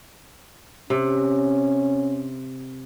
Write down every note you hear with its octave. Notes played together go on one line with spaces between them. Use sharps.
C3 C#4